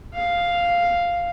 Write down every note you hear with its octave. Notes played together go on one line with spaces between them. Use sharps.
F5